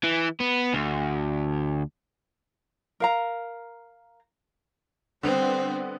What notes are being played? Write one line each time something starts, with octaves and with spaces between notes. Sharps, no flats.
E3
B3
D2
A#4 F5 A#5
D3 G3 B3 C4 C5